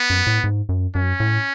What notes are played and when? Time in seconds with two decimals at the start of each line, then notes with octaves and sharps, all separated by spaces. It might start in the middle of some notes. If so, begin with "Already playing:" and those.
Already playing: B3
0.10 F#2
0.27 A2
0.44 G#2
0.69 F#2
0.95 F#2 C#4
1.20 A2